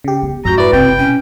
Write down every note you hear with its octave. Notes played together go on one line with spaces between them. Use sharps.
C#3 G4
B3
F2 G#2 F#4 A#5 G6
E4 B4 D5
F#1 C3 C4 G5
B2 C#4